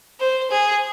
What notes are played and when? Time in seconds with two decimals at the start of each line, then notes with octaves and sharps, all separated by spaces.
0.20 C5
0.51 G#4